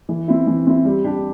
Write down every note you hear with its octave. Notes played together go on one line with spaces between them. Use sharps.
E3
C4 E4
E3
C4 E4
G3
D4 G4